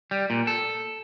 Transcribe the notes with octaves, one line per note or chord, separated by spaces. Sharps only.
G3
A#2
A4